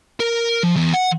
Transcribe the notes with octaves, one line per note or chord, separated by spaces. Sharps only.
A#4
F3
E2
F#5